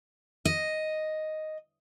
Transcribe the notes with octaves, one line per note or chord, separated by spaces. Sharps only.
D#5